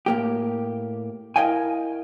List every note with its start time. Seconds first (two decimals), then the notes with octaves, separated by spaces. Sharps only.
0.06 A2 A#3 G4
1.36 E4 A#4 D#5 F5 G5 G#5